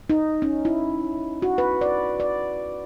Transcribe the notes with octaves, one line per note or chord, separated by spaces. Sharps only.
D#4
C#4
E4
F#4
B4
D5
D5